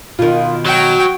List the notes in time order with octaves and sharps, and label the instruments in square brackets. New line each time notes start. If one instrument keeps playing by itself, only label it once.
[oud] B2 D#3 [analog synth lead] F4
[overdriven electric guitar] F#3 [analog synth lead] F#4 [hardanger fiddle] G5